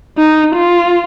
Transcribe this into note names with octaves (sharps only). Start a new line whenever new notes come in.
D#4
F4